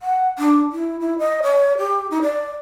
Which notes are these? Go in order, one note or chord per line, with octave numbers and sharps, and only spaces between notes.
F#5
D4
E4
E4
D#5
C#5
G4
D#4
D5